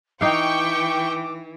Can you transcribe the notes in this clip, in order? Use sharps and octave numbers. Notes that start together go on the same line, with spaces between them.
E3 D#4 F5 G5 C#6 D6